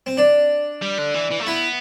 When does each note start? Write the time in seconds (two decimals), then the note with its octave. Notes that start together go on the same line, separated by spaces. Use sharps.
0.06 C4
0.17 D4
0.82 G3
0.98 D3
1.14 E3
1.31 E3
1.40 A3
1.46 B3 E4